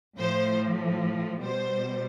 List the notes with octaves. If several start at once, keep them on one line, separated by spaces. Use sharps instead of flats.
A2 F3 C5
B2 G3 C5